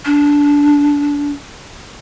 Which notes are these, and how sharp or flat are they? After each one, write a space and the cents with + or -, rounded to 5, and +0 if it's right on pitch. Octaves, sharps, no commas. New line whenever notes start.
D4 -20